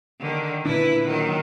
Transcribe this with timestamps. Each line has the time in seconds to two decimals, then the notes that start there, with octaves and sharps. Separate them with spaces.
0.20 D3 D#3
0.65 A#2 D3 D4 E4 B4
1.06 D#3 F#3